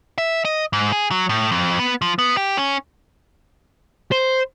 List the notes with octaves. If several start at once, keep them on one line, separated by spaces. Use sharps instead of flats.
E5
D#5
G#2
G#4
F#3
A2
F2
B3
F3
B3
G4
C#4
C5